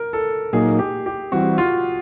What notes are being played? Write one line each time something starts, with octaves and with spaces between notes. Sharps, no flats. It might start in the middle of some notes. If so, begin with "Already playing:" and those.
Already playing: A#4
A4
A#2 F#3 A#3 D#4 G#4
G4
G4
E3 G3 C4 F#4
F4